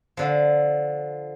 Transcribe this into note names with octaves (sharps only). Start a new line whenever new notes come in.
D3 F3